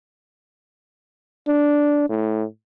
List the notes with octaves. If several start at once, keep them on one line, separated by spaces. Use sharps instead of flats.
D4
A2